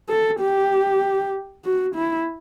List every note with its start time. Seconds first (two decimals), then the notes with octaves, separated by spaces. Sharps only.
0.09 A4
0.40 G4
1.65 F#4
1.95 E4